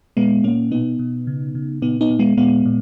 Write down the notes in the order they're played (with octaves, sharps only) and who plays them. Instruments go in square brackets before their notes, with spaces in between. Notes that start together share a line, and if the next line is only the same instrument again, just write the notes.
[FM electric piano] A#2 G#3 B3
A#2 A#3 C#4
B2 B3 D#4
B2
C#3
C#3
A#2 B3 D#4
B3 D#4
A#2
G#3 B3
A#2 G#3 B3
A#2